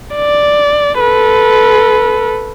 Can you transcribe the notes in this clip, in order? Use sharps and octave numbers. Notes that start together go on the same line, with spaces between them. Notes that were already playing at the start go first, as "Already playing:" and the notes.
D5
A4 B4